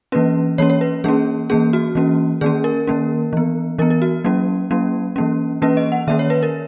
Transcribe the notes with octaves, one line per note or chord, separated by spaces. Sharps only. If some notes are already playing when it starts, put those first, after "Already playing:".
E3 A#3 C#4 B4
E3 A#3 C#4 C#5
C#5
B4
E3 A#3 C#4 G#4
E3 A#3 C#4 G#4
F#4
E3 A#3 C#4
D#3 A#3 C#4 G#4
A#4
D#3 A#3 C#4
E3 B3
E3 B3 A#4
A#4
F#4
F#3 A#3 C#4
F#3 A#3 C#4
E3 A#3 C#4
E3 A#3 C#4 B4
D#5
F#5
D#3 A#3 C#4 E5
C#5
B4
A#4